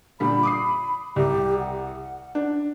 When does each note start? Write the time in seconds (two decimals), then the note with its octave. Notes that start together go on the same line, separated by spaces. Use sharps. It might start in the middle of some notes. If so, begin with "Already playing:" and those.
0.20 A#2 D3 G3 B5
0.43 D6 D#6 C7
1.16 C2 G4
1.59 F#5
2.35 D4